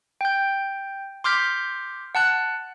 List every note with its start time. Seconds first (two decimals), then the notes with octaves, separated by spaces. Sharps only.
0.21 G5 G6
1.24 C6 D6 F6 G6 B6
2.15 F#5 A5 F#6